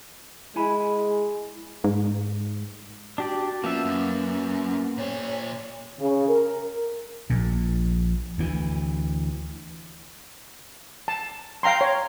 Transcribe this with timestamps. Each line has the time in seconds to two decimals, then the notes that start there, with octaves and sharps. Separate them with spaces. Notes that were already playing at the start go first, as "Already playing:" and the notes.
0.56 G#3 E4 G#5 B5
1.84 G#2
3.18 D4 F#4 G4 D5
3.64 F3 A#3 B3 C#4 E5
3.85 F#2
4.97 A#2 C5 C#5
5.99 C#3
6.28 A#4
7.30 A#1 A#2
8.38 D2 E3
11.08 A5
11.63 F5 G5 A#5 C6
11.81 C#5